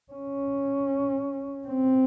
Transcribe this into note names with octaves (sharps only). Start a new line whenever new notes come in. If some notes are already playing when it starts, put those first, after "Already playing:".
C#4
C4